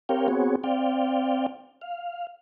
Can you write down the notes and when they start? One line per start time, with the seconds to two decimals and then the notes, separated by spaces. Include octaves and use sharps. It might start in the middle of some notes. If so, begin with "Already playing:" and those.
0.09 C4 G4 A#4 C#5 F5 G5
0.28 B3 C4 F#4 G#4 C#5
0.64 C4 D5 F5 G5
1.81 F5